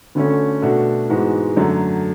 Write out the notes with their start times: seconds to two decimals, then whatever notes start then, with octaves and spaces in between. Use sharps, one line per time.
0.15 D2 D3 A3 C#4
0.62 B2 A3 D4 F#4
1.09 G#2 E3 G#3 B3 F#4
1.57 F#2 D3 F#3 A3